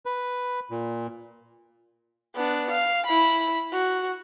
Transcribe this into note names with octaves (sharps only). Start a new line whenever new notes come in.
B4
A#2
B3 D4
F5
E4 B5
F#4